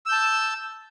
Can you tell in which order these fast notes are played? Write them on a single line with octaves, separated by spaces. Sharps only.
E6 G6 A5